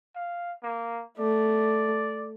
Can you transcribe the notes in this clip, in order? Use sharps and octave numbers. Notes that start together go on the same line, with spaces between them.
F5
A#3
A3 D5